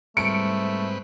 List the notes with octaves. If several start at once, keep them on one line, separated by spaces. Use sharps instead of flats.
C2 G#2 A3 C4 B4 C#7 D7